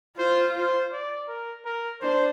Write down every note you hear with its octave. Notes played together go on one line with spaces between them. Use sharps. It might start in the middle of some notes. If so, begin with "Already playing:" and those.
F4 C5
C5
D5
A#4
A#4
D4 C5